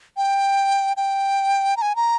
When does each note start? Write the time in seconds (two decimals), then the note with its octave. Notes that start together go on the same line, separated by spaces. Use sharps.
0.17 G5
0.97 G5
1.77 A#5
1.82 G#5
1.96 A#5